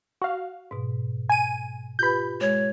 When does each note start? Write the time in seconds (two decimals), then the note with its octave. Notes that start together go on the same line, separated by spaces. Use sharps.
0.22 F#4 F5
0.71 G#2 B2
1.29 G#5 D#7
1.99 F4 G4 B4 B5 G6
2.41 G#3 C#5